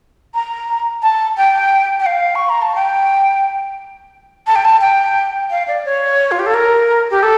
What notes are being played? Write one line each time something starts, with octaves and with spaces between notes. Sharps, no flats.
A#5
A5
G5
G5
F5
C#6
A#5
A5
G5
A5
G5
A5
G5
F5
D5
C#5
F4
G4
A4
A#4
G4
A4